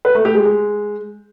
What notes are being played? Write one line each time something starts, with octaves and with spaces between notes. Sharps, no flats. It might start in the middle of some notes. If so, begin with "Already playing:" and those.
B4
A3
G4
G#3
G#3